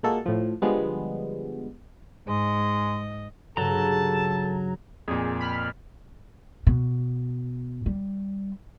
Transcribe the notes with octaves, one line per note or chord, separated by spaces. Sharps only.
A#2 G#3 A#3 F#4 A4
A2 F3
D3 F3 G3 G#3 B3
G#2 G#3 D#5
G2 C#3 F#3 A4 A5 A#5
F2 A#2 G#4
B5 F6
B2
G3